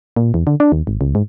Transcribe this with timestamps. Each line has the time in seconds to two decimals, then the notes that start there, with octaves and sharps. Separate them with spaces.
0.16 A#2
0.34 E2
0.47 D3
0.60 D4
0.72 D#2
0.87 G#1
1.01 C#2
1.15 G#2